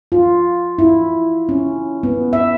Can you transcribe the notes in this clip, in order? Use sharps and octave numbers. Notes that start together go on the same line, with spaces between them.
F4
E4
C#4
B3
E5